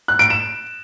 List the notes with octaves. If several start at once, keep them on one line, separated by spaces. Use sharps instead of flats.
F#6
D7
E7